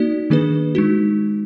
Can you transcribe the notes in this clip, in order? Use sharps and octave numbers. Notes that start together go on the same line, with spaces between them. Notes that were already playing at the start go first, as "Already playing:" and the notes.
Already playing: A#3 D#4 F#4 D5
D#3 A#3 D4 G#4 B4
G#3 D#4 F#4